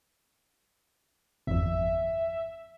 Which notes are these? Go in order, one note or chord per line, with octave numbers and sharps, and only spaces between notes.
G#1 F2 E5